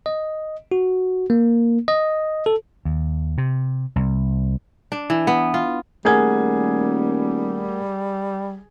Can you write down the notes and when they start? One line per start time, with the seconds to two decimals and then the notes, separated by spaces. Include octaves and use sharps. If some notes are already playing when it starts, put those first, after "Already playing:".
0.06 D#5
0.72 F#4
1.30 A#3
1.88 D#5
2.46 A4
2.85 D#2
3.38 C3
3.96 C2
4.92 D4
5.10 E3
5.27 B3
5.54 F4
6.05 D#1 G3 A3 G#4 A#4 F#5 G#5 G#6